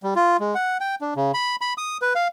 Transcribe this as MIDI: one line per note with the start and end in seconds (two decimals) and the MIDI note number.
0.03 0.14 55
0.16 0.37 65
0.40 0.54 56
0.55 0.78 78
0.81 0.95 79
1.01 1.14 62
1.16 1.32 49
1.34 1.56 83
1.61 1.73 83
1.78 1.98 87
2.02 2.13 71
2.15 2.28 77